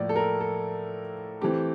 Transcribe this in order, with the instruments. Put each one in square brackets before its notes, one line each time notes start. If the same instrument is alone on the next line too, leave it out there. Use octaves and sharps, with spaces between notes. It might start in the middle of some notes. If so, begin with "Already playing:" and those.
Already playing: [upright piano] A2 F3 A#3 D5
A4
A#4
A4
E3 A3 C4 G4